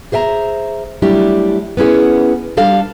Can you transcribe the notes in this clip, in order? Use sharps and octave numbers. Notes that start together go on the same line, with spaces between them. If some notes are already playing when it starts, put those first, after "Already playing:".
G#4 C5 E5 G5 A#5
F#3 G3 A3 D4 E4 G4
B3 C#4 E4 G#4 F#5
G3 D4 A4 F5